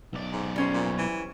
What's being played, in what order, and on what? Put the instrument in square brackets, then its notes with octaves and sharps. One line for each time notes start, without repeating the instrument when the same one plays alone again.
[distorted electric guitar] B1 D5
[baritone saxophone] G#2
[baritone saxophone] C#2 [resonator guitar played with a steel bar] G3 C#4 C5
[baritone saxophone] A#2
E3